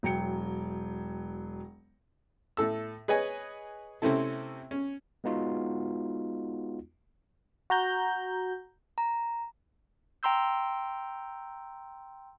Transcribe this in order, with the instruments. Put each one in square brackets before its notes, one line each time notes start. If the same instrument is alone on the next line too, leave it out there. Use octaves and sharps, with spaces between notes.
[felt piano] E1 F#3 G5 C#7
[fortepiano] A2 A4 E6
G#4 B4 C#5 D#5 G#5
C3 A3 C4 C#4 E4 A4
C#4
[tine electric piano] G#3 B3 D#4 F4 F#4
[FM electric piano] F#4 A#5 G6
[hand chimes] A#5
[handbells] G5 A#5 C6 E6 G6